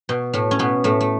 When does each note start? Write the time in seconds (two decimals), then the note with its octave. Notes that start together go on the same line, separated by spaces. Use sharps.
0.09 B2
0.33 A2 A3
0.51 C#4
0.59 B2 B3
0.84 A2 A3
1.00 A3